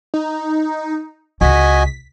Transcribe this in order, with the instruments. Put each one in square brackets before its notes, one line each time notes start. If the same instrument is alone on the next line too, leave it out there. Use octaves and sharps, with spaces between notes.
[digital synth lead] D#4
[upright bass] C#2 [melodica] F#4 D#5 G#5 [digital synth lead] B6